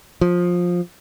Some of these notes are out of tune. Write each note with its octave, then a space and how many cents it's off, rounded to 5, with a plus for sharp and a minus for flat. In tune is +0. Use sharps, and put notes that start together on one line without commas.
F3 +15